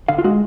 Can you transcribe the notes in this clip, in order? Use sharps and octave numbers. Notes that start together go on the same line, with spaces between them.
D3 F5
F4
G#3 F#4